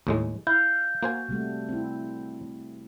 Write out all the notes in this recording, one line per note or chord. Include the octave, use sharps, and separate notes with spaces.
D#2 A2 G#3
E4 F5 G6
A#3 F#4 C5 G#5
C3 G3 A3
C4 E4